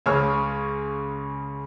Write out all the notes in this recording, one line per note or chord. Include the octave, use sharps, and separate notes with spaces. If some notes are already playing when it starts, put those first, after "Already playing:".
C#2 C#3 C#5 C#6 F6